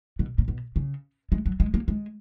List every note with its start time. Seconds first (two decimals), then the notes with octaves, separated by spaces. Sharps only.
0.19 B2
0.38 A#2
0.48 B2
0.76 C#3
1.32 G#3
1.46 F#3
1.60 G#3
1.74 A#3
1.88 G#3